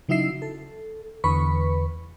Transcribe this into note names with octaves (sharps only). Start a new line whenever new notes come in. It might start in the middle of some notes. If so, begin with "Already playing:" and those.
C#3 F#3 D#4 E4 E5 C7
A4
E2 D3 B4 B5 C#6